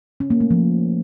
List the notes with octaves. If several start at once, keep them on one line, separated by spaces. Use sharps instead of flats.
C#4
A#3
A3
F3